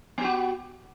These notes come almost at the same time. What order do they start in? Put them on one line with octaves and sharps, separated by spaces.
B3 G4 F#4